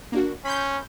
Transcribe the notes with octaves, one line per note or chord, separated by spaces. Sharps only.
A#3 D4 F#4
C#4 B5 C6 G6